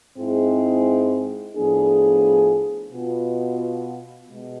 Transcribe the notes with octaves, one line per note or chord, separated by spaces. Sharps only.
G#2 G#3 C4 E4 G#4
A2 F3 B3 D4 G#4
B2 B3 F4
B2 G#3